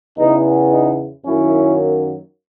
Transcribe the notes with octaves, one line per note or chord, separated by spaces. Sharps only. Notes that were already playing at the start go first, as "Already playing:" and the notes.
E2 C#3 E3 B3 D#4
D#4
F#2 D#3 F#3 A#3 C#4 E4